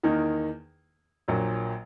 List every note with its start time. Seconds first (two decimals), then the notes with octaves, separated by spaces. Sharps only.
0.03 E2 D#3 A#3 D#4
1.28 A#1 A#2 F#3